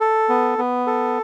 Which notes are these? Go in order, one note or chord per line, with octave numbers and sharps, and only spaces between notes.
A4
B3
B3
A4